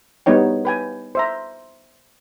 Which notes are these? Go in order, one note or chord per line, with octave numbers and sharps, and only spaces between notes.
G3 B3 D#4 C#5 G5
B4 G5 G#5
C5 E5 A#5